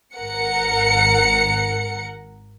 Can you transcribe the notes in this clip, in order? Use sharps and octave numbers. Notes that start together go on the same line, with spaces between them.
G#1 A#4 F#5 C#7